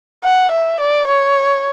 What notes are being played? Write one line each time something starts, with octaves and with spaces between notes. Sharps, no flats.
F#5
E5
D5
C#5